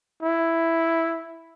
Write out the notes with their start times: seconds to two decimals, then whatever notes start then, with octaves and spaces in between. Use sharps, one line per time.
0.23 E4